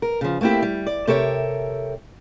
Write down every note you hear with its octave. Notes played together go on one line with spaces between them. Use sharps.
A#4
C#3 F3
A3 A#3 C4 E4 G4
G3
D5
C3 G4 A4 A#4 C#5 E5